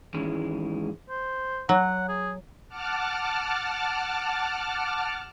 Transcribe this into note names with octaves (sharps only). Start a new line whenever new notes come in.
G#2 D#3 E3 G#3 C#4 E4
C5
F#3 F#5
G#4
F#5 A5 D6 F6